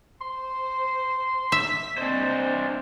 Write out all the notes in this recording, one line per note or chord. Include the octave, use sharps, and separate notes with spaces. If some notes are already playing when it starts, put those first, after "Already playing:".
C5 C6
E5 B6
C4 D4 C5 D#5